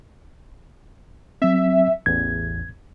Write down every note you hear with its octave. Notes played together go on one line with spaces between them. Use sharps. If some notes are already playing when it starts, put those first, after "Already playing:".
F#3 C4 E5
A1 E2 G#6